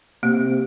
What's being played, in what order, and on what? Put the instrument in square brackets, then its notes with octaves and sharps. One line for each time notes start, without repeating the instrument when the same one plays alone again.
[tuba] C3 [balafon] A#3